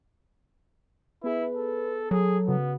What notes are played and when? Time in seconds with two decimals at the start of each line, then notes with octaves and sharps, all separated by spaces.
1.24 B3 E4 G#4 B4
1.56 A4
2.11 F#3 G#4 A4
2.47 C#3 B3 F#4